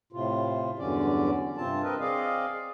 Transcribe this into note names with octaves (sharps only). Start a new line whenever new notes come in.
A2 C3 F4
E2 G2 D3 F#3 C#4 D5
G2 C3 C4 F4 A5
C4 A#4 B4 D#5
C4 G#4 D5 D#5 F5